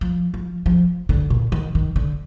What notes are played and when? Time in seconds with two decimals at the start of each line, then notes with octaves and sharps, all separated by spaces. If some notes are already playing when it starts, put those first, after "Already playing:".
0.01 F3
0.34 F3
0.66 F3
1.09 D3
1.30 A#2
1.52 D#3
1.75 D#3
1.96 D3